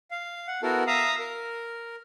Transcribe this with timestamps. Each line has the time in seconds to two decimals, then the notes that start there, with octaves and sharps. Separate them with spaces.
0.11 F5
0.47 F#5
0.62 B3 E4 F#4 A4 A#4
0.87 E5 F5 A#5 D#6
1.19 A#4